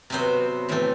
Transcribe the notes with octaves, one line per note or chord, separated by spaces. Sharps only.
C3 F#3 B3 C4 C5
A2 E3 A3 C4